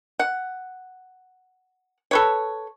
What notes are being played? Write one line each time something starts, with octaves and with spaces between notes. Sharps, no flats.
F#5
A4 B4 C#5